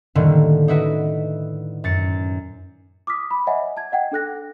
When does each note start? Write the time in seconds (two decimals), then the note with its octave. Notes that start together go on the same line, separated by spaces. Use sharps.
0.15 A2 D3 D#3 F3 G3 A#3
0.68 D#4 E4 F#4 B4
1.84 F#2 A6 C#7
3.07 D6 D#6 F6 B6
3.31 B5
3.47 C#5 D#5 E5 F#5 G#5
3.77 A5 G#6
3.92 D#5 F#5 G5 G#6
4.12 D4 A4 F#6 A#6